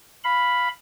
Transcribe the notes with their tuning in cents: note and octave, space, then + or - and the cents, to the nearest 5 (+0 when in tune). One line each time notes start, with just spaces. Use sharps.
F5 +0 B5 +0